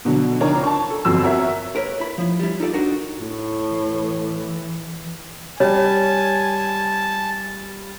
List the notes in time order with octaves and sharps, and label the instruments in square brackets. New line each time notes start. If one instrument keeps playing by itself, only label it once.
[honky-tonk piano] B2 D3 F#3
C#2 D4 D#4 A#4 C#5 A#5
A5 C#6
A4
G1 F2 F#3 E6
F#4 A#4 C#5 E5
[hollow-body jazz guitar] A#4 B4 C#5
E4 B5
F3 E4
G3 E4
D#4 F4 A4 D5
D4 D#4 F#4 A#4
[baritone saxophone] A2
[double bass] E3
[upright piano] G3 [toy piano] C#5 [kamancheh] G#5 [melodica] A5